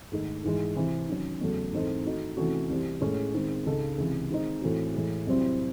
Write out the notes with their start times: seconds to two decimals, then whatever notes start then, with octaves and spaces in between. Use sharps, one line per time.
0.12 G#2 D#3 A3 D#4 A4
0.44 G#2 E3 G#3
0.76 C3 E3 C4
1.09 D#3 F#3 C#4
1.41 E2 C#3 F#3 A3
1.72 G#2 E3 C4 D#4 A4
2.06 D#3 A3 D#4 F#4
2.37 C3 E3 A3 C#4 F#4
2.70 C2 C3 E3 C4
3.01 A2 G#3 C#4 G#4
3.34 D#3 G#3 C4
3.66 C#2 C#3 G#3 D#4 A4
3.98 C#2 C3 E3
4.30 D#3 G#3 C4 D#4
4.62 A2 E3 A3 C4 F#4
4.94 A2 E3 G#3
5.27 C2 C3 F#3 C4 E4